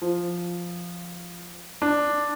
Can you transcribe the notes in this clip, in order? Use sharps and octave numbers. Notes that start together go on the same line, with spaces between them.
F3
D4